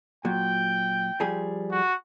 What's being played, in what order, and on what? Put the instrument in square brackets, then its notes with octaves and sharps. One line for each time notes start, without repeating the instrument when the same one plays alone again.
[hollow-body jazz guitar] A#2 F#3 [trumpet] G5
[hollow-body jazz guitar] F3 G3 G#4
[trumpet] F#4